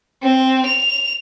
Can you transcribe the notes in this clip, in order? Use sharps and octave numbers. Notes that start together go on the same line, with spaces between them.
C4
F7